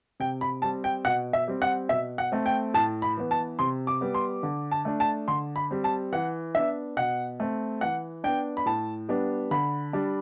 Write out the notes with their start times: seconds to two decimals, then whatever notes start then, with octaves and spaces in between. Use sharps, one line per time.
0.20 C3 G5
0.41 B5
0.62 G3 C4 A5
0.84 G5
1.05 B2 F#5
1.33 E5
1.48 G3 C4
1.62 F#5
1.89 B2 E5
2.18 F#5
2.32 A3 C4
2.46 G5
2.74 A2 A5
3.02 B5
3.17 E3 B3
3.31 A5
3.59 C3 C6
3.87 D6
4.01 G3 B3
4.14 C6
4.43 D3
4.71 A5
4.85 A3 D4
5.00 A5
5.28 D3 C6
5.56 B5
5.71 G3 C4
5.84 A5
6.12 E3 F#5
6.55 B3 D4 E5
6.97 B2 F#5
7.40 A3 C4
7.81 E3 F#5
8.24 B3 D4 G5
8.57 B5
8.66 A2 A5
9.09 G3 B3 D4
9.51 D3 B5
9.93 G3 D4